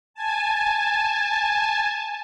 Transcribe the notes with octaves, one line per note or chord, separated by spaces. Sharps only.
G#5 A5